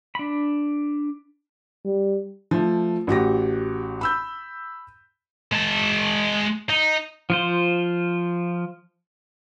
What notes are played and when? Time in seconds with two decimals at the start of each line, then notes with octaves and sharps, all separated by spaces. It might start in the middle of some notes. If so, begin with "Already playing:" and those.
0.15 D4 B5
1.85 G3
2.51 F3 A3
3.07 A1 F#4 G4 A#6
4.01 B5 E6 G6
5.52 G#3 A5
6.70 D#4
7.30 F3 F4 C5